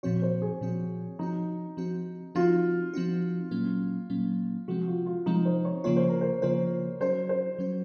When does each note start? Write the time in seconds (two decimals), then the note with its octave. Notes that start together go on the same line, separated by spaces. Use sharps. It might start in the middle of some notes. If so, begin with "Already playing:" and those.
0.03 A#2 F3 C4 F#4 C#5
0.22 C5
0.42 G#4
0.61 A#2 F3 C4 F#4
1.19 F3 C4 D#4 F#4
1.77 F3 C4 F#4
2.35 F3 C4 D#4 F4 F#4
2.94 F3 C4 D#4 F#4
3.51 A#2 F#3 A#3 C#4
4.10 A#2 F#3 A#3 C#4
4.68 C3 F3 G#3 C4 F#4
4.87 F4
5.06 F4
5.26 C3 F3 G#3 C4 D#4
5.45 C5
5.65 C#5
5.84 C#3 F3 A#3 F4 C#5
5.96 C5
6.09 A#4
6.21 C5
6.42 C#3 F3 A#3 F4 C5
7.00 F#3 C#4 F#4 C5
7.29 C5
7.58 F#3 C#4 F#4